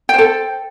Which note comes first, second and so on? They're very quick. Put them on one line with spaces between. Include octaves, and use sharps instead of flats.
G5 C5 A4